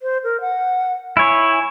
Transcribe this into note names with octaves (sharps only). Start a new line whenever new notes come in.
C5
A#4
F#5
E4 C#5 G#5